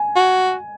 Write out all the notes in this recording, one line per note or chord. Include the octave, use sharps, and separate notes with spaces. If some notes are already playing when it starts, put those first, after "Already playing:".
Already playing: G#5
F#4